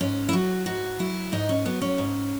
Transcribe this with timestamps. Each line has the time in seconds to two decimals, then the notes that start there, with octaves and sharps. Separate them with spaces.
0.01 G#2 C#4
0.29 E4
0.33 F#3 F#4
0.66 G#2 F#4
0.99 F#3 E4
1.32 G#2 D#4
1.49 C#4
1.65 F#3 B3
1.82 C#4
1.98 G#2